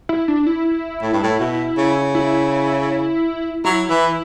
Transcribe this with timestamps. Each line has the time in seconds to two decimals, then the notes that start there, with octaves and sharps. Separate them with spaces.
0.09 E4
0.28 D4
0.46 E4
1.03 A2
1.13 G2
1.23 A2
1.40 B2
1.78 C#3
2.15 E4
3.65 F#3 E4
3.90 E3